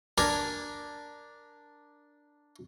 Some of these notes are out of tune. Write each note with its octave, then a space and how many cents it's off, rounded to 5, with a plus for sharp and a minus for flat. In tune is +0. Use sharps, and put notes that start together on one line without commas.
D4 +0 A#4 +0 G#5 +0